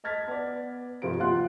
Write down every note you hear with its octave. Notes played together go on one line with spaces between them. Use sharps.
D#5 A5 F6 G#6 A6 B6
B3 D5
G2 C3 F3 C5 D7
D#2 F4 F5 F#5 C6 F#6